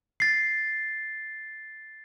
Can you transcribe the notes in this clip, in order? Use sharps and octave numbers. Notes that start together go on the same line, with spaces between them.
A6 C7